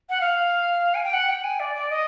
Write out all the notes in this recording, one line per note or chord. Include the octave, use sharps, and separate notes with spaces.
F#5
F5
G#5
G5
F#5
G5
G#5
D5
D5
D#5